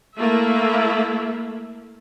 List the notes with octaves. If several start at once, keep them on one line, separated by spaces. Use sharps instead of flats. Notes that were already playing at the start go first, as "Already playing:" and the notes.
A3 A#3 E4 E5